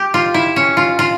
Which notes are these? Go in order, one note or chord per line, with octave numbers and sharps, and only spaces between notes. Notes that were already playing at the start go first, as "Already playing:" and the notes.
Already playing: G4
F4
E4
C#4
F4
F4